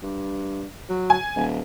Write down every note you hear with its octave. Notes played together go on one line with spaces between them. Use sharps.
G2
F#3
G#5
D#1